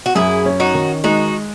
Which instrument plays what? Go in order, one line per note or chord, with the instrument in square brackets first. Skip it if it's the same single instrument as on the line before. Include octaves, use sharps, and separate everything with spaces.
[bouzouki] F#4
[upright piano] F#2 [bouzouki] E4 G#4
[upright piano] C#4
[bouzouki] D#4 F#4
[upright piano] D#3
[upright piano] G#3 [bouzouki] D#4 F#4